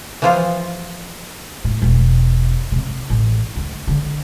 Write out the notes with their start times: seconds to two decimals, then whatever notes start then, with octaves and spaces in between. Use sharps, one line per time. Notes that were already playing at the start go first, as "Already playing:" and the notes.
0.22 E3 F3 F4
1.64 A2
1.82 E1
2.72 C3
3.10 A1
3.56 D2
3.87 D3